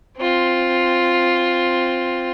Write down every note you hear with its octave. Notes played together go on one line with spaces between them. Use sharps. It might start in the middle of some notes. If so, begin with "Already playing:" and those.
C4 F4